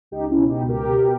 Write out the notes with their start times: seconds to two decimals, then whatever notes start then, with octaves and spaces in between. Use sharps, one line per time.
0.11 C#2 D#4 G4
0.31 C#4 E4
0.37 B2
0.49 D#4 G4
0.62 C#2
0.69 G4 A#4
0.87 B2